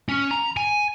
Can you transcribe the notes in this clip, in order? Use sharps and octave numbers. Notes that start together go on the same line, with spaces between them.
C#4
A#5
G#5